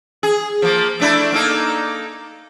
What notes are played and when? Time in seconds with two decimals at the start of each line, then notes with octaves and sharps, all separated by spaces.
0.23 G#4
0.62 F3 A#3
1.00 A3 D4 E4
1.32 A#3 D#4 A4